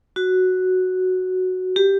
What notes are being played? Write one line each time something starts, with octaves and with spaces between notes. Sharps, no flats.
F#4
G4